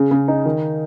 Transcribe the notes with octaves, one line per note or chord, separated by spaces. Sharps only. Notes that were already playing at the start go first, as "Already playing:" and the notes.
Already playing: C#3
C#3
D#4
D#3